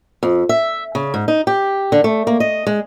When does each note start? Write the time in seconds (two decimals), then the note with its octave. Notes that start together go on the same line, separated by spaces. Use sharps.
0.23 F2
0.49 E5
0.95 C#3
1.14 G#2
1.28 D#4
1.47 G4
1.92 D3
2.04 A3
2.27 A#3
2.40 D#5
2.67 G#3